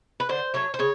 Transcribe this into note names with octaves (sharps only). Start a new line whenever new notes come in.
B4
D3 C5
F#3 A3 C#5
C5
C#3 C#5